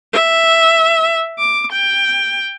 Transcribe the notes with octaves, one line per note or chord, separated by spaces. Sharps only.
E5
D6
G5